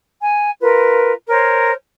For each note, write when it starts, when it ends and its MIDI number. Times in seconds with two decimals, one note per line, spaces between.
0.20 0.51 80
0.60 1.12 65
0.60 1.12 70
0.60 1.12 71
1.28 1.71 70
1.28 1.71 72
1.28 1.71 73